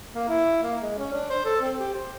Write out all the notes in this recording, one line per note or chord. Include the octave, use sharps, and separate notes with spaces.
A#3
E4
A#3
G#3
C#4
D4
C5
A4
C4
G4
C5